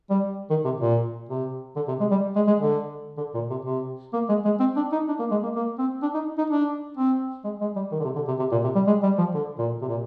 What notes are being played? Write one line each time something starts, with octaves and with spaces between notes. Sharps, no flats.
G3
D#3
C3
A#2
C3
D3
C3
G#3
G3
G#3
G#3
D3
D3
A#2
C3
C3
A#3
G#3
G#3
C4
D4
D#4
D4
A#3
G#3
A#3
A#3
C4
D4
D#4
D#4
D4
C4
G#3
G#3
G3
D#3
D3
C3
D3
C3
C3
A#2
C3
G3
G#3
G3
F3
D3
A#2
C3
A#2